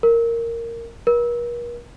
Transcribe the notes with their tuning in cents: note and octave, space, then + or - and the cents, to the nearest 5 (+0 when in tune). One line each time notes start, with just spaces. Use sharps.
A#4 -10
A#4 +45